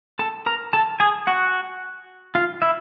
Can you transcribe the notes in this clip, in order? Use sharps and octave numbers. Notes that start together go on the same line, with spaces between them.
A4 A5
A#4 A#5
A4 A5
G#4 G#5
F#4 F#5
F4 F5
E4 E5